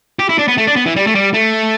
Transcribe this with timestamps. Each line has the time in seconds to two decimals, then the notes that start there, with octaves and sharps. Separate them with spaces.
0.19 G4
0.29 E4
0.38 D4
0.48 B3
0.58 A3
0.67 D4
0.76 B3
0.86 E3
0.96 G3
1.07 A3
1.15 G3
1.34 A3